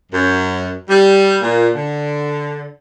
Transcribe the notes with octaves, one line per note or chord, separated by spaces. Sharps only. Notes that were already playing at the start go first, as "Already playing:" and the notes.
F#2
G3
A#2
D3